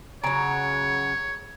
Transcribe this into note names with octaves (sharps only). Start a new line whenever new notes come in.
C#3 F#3 C#5 A#5 D7